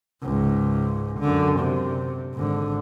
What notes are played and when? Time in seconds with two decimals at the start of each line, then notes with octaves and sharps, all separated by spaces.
0.22 C#2 G#2
1.20 F#2 D3
1.60 C3
2.35 G#1 D3